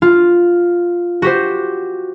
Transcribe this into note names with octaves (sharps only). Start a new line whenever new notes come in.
F4
F#4 G4 C5